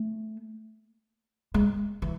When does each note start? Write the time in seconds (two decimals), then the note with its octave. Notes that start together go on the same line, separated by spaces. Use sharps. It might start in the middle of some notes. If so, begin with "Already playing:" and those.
Already playing: A3
1.54 G#3
2.02 E3